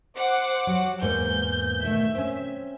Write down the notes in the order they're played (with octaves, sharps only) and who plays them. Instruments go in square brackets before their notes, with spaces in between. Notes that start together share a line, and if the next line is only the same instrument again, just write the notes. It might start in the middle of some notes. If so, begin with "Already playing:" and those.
[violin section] C5 F#5 D6
[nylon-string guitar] F#3
[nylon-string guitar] E2 G#2 A#3 [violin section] G6
[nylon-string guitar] B2 D#3 A3 [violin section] E5
[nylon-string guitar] C4 C#4